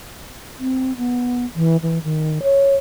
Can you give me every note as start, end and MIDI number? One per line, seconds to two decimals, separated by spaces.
0.59 0.96 60
0.97 1.45 59
1.56 1.77 52
1.82 1.99 52
2.04 2.42 51
2.43 2.75 73